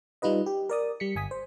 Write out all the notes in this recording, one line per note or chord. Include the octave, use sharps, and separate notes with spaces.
G3 D#4 F4 B4 D#5
G4
A#4 D5 D#6
G3 B6 C#7
G1 G#5 D#6 B6
C5